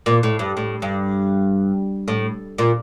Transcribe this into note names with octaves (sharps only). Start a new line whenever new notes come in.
A#2
A2
G2
A2
G2
A2
A#2